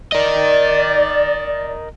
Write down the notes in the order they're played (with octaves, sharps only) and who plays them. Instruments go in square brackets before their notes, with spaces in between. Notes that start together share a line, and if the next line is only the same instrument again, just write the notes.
[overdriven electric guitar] A#4 D#5 [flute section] D5